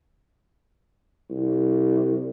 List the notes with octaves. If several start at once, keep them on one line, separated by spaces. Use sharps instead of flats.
C2